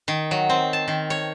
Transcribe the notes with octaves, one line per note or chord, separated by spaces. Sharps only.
D#3
F#3
C4
A5
D#3
C#5